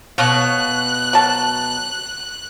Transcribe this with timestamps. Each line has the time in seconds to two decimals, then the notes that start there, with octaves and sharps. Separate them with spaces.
0.18 B2 C#5 F5 F#6
1.13 F#3 A#4 A5